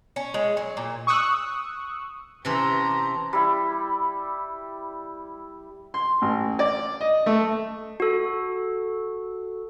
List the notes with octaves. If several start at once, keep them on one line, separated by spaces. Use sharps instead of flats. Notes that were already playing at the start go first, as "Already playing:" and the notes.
C#4
G#3
F#3
A#2
C#6 D#6 E6 F#6
C3 E3 C#4 G4 A5 A#5 C6
G3 E4
C6
A1
D5
D#5
A3
F#4 A4